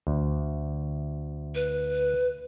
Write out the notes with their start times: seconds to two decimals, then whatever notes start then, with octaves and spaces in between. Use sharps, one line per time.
0.07 D2
1.55 B4